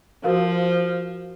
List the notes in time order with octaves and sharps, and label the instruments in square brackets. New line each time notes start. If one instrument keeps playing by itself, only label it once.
[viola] F3 [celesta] F#4 A#4 F5